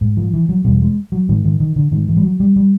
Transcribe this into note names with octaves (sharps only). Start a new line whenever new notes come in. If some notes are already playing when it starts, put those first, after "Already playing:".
G#2
F3
E3
F#3
E2 B2 G3
G#3
F#3
G#2 D#3
D#3
D#3
D3
G#2 D#3
E3
G3
F#3
G3
G3